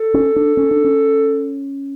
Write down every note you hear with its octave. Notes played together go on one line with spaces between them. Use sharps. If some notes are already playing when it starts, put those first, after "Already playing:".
Already playing: A4
C#4
D4
C#4
D4
C#4